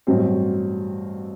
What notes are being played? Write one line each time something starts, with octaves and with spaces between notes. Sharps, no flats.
A1 G2 F#3 C4